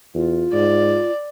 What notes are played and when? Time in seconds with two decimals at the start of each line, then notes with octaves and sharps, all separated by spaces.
0.15 E2 F4
0.53 G#2 D5